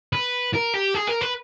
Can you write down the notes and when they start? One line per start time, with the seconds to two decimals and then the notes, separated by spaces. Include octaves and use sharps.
0.13 B4
0.54 A#4
0.74 G4
0.94 G#4
1.07 A#4
1.21 B4